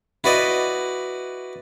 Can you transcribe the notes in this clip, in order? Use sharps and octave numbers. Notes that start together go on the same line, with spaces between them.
E4 F#4 B4 D5 D#5